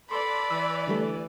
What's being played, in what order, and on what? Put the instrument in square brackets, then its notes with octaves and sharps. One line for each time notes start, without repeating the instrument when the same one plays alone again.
[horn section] A4 [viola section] B4 D5 [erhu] B5 [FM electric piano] C6
[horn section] E3 [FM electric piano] E6
[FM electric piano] D3 G3 A3